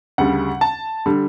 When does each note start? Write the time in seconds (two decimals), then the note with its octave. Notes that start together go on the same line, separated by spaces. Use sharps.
0.18 D2 C#3 G3 F#5
0.61 A5
1.06 D3 G3